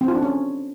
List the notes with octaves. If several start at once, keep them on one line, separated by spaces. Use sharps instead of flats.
C4
F4
D4
C#4